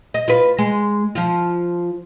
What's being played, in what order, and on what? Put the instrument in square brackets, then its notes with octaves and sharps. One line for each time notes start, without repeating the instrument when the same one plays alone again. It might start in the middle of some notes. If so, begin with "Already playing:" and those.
[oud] D#5
F4 B4
G#3
F3 F4